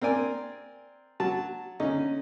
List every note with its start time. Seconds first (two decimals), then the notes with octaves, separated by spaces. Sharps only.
0.02 C4 A#4 D5 G#5
1.20 F#3 A5
1.80 D3 C#4 D#4